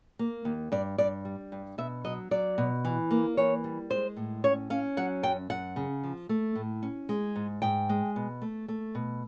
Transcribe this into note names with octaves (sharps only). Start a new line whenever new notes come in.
A#3
D#2
G2 D5
G2 D5
G3
G2
B2 E5
F#3 D#5
F#3 D5
B2
E3
A#3
E3 C#5
G3
G#3 C5
A2
C#4 C#5
C#4 F5
F#3 F#5
F#2 G5
F#2 F#5
C#3
F3
A3
A2
C#4
G#3
G#2
G#2 G5
G#3
B2
A3
A3
B2